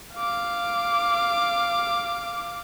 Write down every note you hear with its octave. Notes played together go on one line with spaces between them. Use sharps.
F5 D6